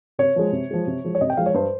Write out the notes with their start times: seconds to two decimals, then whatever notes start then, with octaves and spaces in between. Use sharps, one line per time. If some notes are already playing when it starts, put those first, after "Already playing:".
0.19 C3 C#5
0.36 F3 G#3
0.52 C3
0.71 F3 G#3
0.87 C3
1.04 F3 G#3
1.15 C#5
1.21 C3 D#5
1.30 G5
1.37 F3 G#3 F5
1.46 C#5
1.54 G2 C5